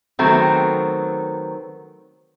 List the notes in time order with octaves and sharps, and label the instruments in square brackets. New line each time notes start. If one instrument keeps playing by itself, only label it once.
[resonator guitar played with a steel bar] D#3 F#3 A3 B3 C4